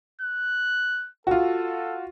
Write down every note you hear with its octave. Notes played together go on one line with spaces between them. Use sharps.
F#6
F4 F#4 A4